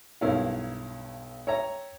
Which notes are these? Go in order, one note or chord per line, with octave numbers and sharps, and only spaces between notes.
B1 G2 E4 A#4 C#5 F5
C#5 E5 G5 A#5